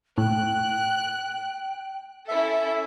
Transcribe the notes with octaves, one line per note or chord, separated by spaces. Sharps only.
A2 G5 F#6
C#4 E4 A4 E5